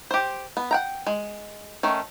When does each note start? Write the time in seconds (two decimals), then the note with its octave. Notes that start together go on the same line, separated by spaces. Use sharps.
0.11 G4 C5
0.57 B3
0.71 F#5 G5 A#5
1.07 G#3
1.83 D#3 A3 C#4